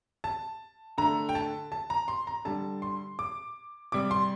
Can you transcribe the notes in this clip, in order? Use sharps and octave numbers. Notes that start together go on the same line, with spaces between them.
A5
D3 A3 A#5
G5
A5
A5
A#5
C6
A#5
D3 G3 A5
C6
D6
C3 G3 D6
C6